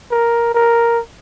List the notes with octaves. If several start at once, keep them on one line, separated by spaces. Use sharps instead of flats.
A#4
A#4